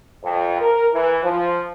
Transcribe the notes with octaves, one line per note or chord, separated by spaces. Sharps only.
F2
A#4
E3
F3